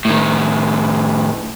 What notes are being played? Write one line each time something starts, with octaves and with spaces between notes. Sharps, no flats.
A2 D#3